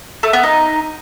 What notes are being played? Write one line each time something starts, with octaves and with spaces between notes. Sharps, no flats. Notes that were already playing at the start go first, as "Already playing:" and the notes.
A3
B3
D#4